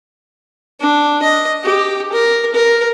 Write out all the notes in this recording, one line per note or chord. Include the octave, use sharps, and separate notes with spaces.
D4
D#5
G4
A#4
A#4